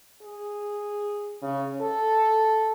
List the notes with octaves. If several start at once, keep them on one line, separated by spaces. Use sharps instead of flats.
G#4
C#3
A4